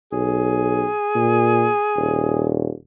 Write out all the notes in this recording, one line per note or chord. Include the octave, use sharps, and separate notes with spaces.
B1 G#4
A#2
D#1